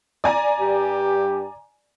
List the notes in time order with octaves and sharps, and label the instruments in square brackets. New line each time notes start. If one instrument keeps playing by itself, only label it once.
[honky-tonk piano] D5 G#5 A#5
[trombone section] G2 G4